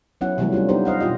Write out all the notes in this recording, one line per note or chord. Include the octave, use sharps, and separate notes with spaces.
F#3 B3 C#4 E4 F#5
C3 E3 F#3 G3 A3 B3
G3 A3 D4 F4
B3 D#4 G4 C5
C5 D#5 F5 F#5
B2 C4 F4 G4 D#5